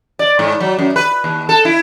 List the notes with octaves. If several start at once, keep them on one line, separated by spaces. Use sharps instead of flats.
D5
G#2
F#3
F#2
B4
D#2
A4
E4